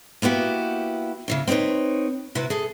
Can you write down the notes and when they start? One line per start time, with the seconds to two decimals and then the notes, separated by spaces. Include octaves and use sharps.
0.22 A#3 B3 E4 F#4 G4
1.28 C#3 E3 C#4
1.47 C4 D#4 A4 B4 C#5
2.35 C3 E4 F#4 B4
2.50 G#4 A4